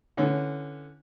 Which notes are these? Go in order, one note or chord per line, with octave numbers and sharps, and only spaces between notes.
D3 E3 C#4